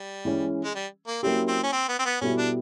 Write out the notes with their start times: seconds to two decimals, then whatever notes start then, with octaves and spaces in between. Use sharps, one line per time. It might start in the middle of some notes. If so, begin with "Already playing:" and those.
Already playing: G3
0.25 E3 G#3 C#4
0.64 G#3
0.75 G3
1.07 A#3
1.23 F#3 A#3 C4 C#4 E4 G4
1.48 C4
1.63 C#4
1.72 C4
1.89 B3
1.99 C4
2.05 B3
2.21 B2 G3 B3 C#4 E4 A4
2.38 D4